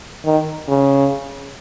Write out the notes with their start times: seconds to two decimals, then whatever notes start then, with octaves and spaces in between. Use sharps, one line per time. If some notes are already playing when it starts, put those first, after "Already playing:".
0.25 D#3
0.68 C#3